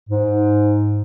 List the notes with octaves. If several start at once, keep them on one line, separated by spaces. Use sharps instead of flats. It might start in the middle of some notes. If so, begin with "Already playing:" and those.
G#2